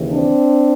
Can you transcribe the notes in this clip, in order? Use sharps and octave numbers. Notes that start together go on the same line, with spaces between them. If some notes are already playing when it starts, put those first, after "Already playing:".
Already playing: D#2 C#3 E3
C4 D4